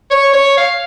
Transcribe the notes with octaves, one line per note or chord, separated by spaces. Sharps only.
C#5
C#5
F5